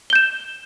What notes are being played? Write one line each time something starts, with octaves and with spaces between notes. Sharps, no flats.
G6 E7 G7